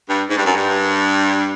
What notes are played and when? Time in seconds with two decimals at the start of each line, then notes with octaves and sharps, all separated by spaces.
0.09 G2
0.29 G#2
0.36 G2
0.45 F#2
0.54 G2